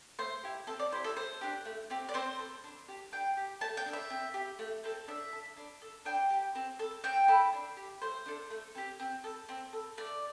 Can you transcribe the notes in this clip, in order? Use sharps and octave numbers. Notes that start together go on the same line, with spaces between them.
A3 C5
E4 G4
C4 A4
D5
E4 G4 C5
A4
A3 C5
D4 G4
A3
C4 G4
D5
C4 C5
A4
D4
G4
D4 G5
G4
A3 A5
G5
D4 A4
E5
C4
G4
A3
C4 A4
D4 E5
A4
D4
A4
D4 G5
G4
C4
A4
C4 G5
E4 A4
D4
G4
A3 C5
D4 A4
A3
C4 G4
C4
A4
C4
A4
A3 D5